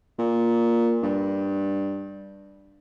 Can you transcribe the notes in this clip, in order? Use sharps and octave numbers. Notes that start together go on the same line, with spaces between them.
A#2
G2